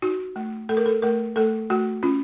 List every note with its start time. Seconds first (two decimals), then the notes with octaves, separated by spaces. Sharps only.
0.02 D#4 F#4
0.36 A3
0.69 A3 A4
0.77 A#4
0.86 A4
1.02 A3 A#4
1.36 A3 A4
1.70 A3 F#4
2.03 C#4 F4